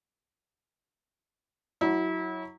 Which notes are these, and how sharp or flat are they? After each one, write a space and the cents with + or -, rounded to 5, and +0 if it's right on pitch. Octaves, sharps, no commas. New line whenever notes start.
F#3 +0 E4 -30